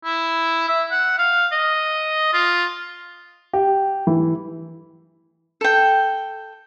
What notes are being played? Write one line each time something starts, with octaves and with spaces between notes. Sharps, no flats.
E4
E5
F#5
F5
D#5
F4
G4
E3
A4 G5